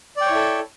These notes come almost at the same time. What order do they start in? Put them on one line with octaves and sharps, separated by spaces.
D5 G5 C#5 E4 A4